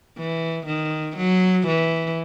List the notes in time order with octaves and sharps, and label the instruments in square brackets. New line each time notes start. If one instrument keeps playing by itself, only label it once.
[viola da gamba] E3
D#3
F#3
E3